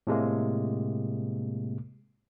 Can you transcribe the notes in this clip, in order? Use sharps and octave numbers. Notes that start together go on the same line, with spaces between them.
A2 C3 G#3 A#3